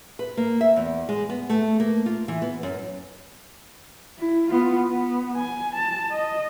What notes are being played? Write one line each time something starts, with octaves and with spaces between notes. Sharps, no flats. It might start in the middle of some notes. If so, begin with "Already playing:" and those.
B4
A#3
E5
E2
G#3
B3
A3
A#3
F4
E3
B3
F#2
E4
B3 F4
B3
G#5
A5
D#5